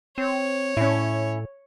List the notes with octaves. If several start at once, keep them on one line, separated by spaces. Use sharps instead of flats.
C4 C#5
A2 C#4 E4